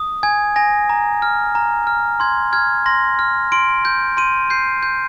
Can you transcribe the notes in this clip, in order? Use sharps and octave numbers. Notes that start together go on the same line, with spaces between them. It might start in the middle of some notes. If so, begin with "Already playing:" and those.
Already playing: D#6
G#5 G#6
G#5 A#6
A#5
F6
A#5
F6
C6 G#6
F6 G#6
C6 A#6
F6
C6 D7
G6
C6 D#7
G6 C7
G6